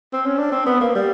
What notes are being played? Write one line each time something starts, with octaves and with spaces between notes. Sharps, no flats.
C4
C#4
D4
C4
B3
A#3
G3